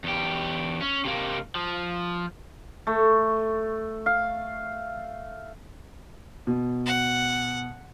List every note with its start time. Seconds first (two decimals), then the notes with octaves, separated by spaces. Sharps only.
0.04 E2 G4
0.81 C#4
1.05 C3 A#3
1.55 F3
2.87 A3
4.06 F5
6.47 B2
6.86 F#5